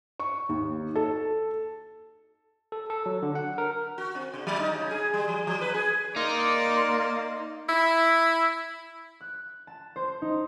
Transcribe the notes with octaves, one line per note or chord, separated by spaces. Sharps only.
C#6
D#2
A4
A4
A4
F#3
D3
F#5
A#4
F#4
C4
C3
F#3
D#4
C#3
G#4
G3
F3
F3
B4
G#4
A#3 D#4 D5 C6
E4
F#6
A5
C5
D#4